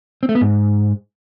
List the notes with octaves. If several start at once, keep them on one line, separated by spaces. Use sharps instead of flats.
C4
A3
B3
G#2